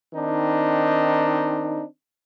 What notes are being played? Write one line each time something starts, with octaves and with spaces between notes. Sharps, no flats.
D#3 C4 D4 D#4